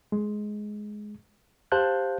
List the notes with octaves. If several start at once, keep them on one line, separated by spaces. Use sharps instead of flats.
G#3
G4 C5 F5 A5 F#6 G6